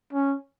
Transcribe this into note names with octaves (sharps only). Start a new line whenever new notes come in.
C#4